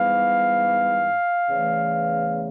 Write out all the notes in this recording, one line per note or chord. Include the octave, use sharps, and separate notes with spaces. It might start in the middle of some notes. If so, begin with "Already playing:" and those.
Already playing: G#2 E3 G3 B3 F5
E2 C#3 E3 A3